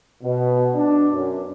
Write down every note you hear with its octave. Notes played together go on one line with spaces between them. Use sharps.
B2
D4
F#2